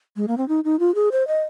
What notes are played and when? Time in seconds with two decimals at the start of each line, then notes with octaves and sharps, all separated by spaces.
0.16 G#3
0.28 A#3
0.38 C4
0.48 D#4
0.64 D#4
0.79 F4
0.95 G#4
1.12 C5
1.28 D#5